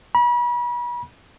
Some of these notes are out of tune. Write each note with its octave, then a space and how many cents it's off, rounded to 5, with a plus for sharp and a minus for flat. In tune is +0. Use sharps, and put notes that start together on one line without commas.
B5 -40